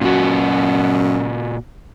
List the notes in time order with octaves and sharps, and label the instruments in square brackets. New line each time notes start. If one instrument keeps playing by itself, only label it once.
[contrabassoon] F#2 [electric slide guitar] A#2 F#4